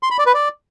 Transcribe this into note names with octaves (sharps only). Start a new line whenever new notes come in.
C6
B5
D5
B4
D5